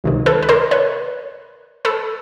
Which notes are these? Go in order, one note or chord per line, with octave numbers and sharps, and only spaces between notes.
C#2 C3 D#3
A4 B4
B4
A#4 C5
B4 C#5
A4 B4